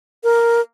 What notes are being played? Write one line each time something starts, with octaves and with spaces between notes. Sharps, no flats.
A#4